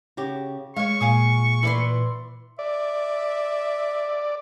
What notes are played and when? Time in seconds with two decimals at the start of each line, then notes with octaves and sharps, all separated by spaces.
0.17 C#3 F#4 G4
0.76 G#3 C#5 F5 C#6
1.01 A#2 F5 G#5 D#6
1.63 E3 E4 B4 D5 C6
2.59 D5 E5